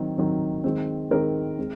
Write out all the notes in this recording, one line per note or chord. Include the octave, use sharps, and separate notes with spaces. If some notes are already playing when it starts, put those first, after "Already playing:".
Already playing: D#3 F#3 C4
D#3 F#3 C4
D#3 G#3 C4
D#3 G#3 C4 A#4
G#3 C4